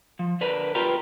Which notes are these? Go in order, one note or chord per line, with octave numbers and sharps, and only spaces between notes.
F3
D3 D4 A#4 B4
F4 G4 A#4 B4